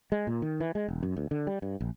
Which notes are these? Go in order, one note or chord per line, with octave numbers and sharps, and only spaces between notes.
G#3
A#2
D#3
E3
G#3
E1
F#2
D2
D3
G3
G2
A#1